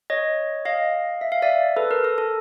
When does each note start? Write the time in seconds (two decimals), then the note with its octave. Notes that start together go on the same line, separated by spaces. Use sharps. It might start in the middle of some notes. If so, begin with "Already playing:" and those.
0.10 C#5 D#5
0.65 D#5 F5
1.21 E5
1.32 F5
1.42 D5 E5
1.77 A4 B4
1.91 A#4
2.04 A4
2.18 A4